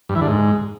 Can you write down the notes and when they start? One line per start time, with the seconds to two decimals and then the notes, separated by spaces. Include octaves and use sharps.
0.09 G2
0.15 E3
0.21 D3
0.27 G#2